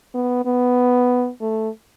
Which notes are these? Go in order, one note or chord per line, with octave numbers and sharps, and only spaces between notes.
B3
B3
A3